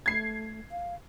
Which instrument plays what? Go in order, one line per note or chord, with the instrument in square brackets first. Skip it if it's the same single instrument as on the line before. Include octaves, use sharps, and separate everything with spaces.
[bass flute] A3 [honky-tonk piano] G#6 C7
[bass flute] F5